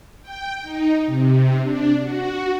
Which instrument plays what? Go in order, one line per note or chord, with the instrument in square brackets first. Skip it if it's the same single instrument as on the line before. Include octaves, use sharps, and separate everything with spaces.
[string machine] G5
D#4
C3
D4
F#4